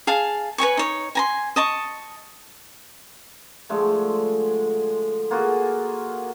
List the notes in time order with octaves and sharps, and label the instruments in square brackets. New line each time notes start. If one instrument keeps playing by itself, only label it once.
[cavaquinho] G#4 F5 A5
B4 C#5 G#5 C#6
D#4 C#5
G#5 A#5 C6
D#5 A5 C#6
[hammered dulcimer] D3 F3 G#3 A3
A#3 F4 F#4 G#4